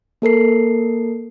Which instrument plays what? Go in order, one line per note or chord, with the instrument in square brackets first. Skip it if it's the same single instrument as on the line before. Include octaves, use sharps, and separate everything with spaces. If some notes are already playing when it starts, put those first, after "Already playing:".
[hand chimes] A#3 A4 A#4 C7